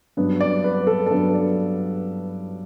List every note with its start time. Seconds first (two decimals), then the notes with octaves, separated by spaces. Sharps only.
0.17 G2 F#3 B3 D4
0.41 D5
0.64 B4
0.87 A4
1.06 A4
1.11 G2 F#3 B3 D4 B4
1.35 D5